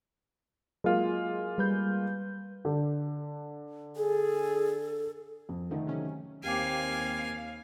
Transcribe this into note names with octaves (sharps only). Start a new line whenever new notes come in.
F#3 G#3 A#3 F4
G3 B4 G6
D3
G#4 A4
F2
D3 D#3 F3 A3
C3 F#3 C#4
D#2 A#3 C4 G4 F5 G5 G#5 D6